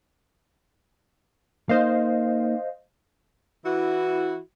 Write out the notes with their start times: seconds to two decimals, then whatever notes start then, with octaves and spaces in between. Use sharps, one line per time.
1.69 A#3 D#4 C5 D#5 F5
3.65 E3 E4 F#4